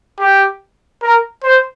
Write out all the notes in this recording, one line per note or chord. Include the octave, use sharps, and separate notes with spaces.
G4
A#4
C5